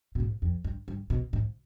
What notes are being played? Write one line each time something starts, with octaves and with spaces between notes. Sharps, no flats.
B2
G#2
F2
G2
G2
B2
G#2